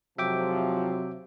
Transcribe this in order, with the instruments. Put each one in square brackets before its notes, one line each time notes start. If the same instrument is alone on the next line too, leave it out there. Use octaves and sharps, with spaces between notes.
[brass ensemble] F2 G#2 F3 [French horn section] C3 [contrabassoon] F#3 [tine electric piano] E5 G5 D6